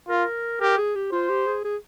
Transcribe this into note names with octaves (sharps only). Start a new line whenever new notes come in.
F4 A#4
G4 A#4
G#4
G4
F4 C5
G4
G#4
G#4